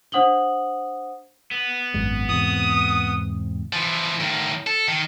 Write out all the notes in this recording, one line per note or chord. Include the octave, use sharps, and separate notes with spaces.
D4 C5 F#5 D#6 F#7 G7
B3
G#1 F#2 G#3
E2 G#2 C3 D#6
E3 F3
A2 D#3
A4
D#3